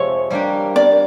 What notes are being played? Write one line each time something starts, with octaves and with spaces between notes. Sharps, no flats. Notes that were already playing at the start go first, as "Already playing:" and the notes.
Already playing: F2 C3 F3 G#3 C4 C#5
G3 A#3 D4 G4
D5